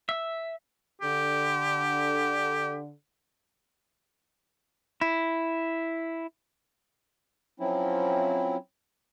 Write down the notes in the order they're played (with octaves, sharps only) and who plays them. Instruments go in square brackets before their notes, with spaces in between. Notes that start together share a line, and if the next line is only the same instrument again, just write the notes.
[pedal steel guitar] E5
[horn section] D3 [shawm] G4
[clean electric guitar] E4
[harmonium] F3 F#3 C4 C#4 E4